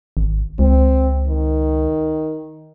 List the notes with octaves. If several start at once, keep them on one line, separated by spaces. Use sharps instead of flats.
G#1
C#2 C4
D#3